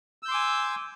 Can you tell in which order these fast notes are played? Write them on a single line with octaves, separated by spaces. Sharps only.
E6 G6 C6 D6 G#5